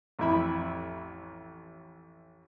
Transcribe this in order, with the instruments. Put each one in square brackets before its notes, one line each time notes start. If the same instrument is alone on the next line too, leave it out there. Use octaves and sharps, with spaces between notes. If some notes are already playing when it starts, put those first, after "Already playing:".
[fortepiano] A1 F2 E4 B5